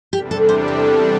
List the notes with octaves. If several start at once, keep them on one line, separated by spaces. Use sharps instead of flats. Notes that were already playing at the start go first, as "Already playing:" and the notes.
E2 C3 G3 D4 G4
A4
C5
A4